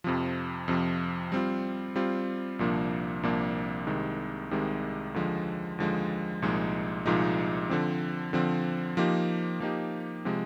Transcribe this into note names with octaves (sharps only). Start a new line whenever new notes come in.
F2 C3 F3
F2 C3 F3
G3 C4 F4
G3 C4 F4
C2 A#2 F3 A#3 D4
C2 A#2 F3 A#3 D4
C2 C3 D#3 G#3
C2 C3 D#3 G#3
D#2 D3 F3 G#3
D#2 D3 F3 G#3
C2 A#2 F3 G#3 D#4
C2 A#2 F3 G#3 D#4
D3 F3 C4
D3 F3 C4
F3 A#3 D#4 G4
F3 A#3 D#4 G4
C3 F3 G#3